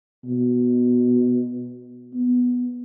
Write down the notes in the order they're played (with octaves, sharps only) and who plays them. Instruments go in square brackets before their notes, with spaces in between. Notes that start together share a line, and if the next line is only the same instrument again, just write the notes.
[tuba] B2
B3